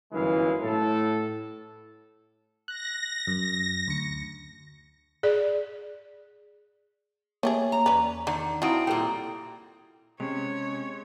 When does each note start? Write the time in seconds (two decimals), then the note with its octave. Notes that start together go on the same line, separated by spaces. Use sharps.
0.13 G1 F#2 E3 G#3 E4 F5
0.62 A2 A4
2.68 F#6 A#6
3.27 F#2
3.88 D2 C#7
5.23 G#4 D5
7.43 A3 A#3 G4 G#4 C#5
7.72 A#5
7.86 E2 C#4 B4 D5
8.27 D3 D#3
8.62 F3 F#3 C4 E4 D#6 D7
8.87 A#2 G3 A4 G5
10.20 C3 G#3 C#4 C#5